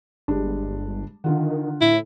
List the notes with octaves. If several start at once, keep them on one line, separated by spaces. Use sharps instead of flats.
G1 G3 G#3 D4
D3 D#3 F4 F#5
A2 E4